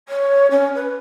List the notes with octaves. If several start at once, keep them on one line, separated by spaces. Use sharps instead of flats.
C#5
C#4
B4